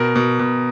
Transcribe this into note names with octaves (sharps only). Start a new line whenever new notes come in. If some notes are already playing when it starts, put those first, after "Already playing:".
Already playing: B2 A#4
B2
B2